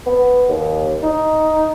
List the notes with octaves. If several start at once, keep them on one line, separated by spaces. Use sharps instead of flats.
B3
D#2
D#4